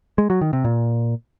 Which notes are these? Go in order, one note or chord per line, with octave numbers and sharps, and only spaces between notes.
G#3
F#3
D#3
C3
A#2